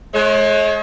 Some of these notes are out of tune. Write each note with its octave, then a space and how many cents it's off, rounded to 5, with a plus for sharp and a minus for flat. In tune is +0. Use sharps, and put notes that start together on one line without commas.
G#3 +40 C#5 -35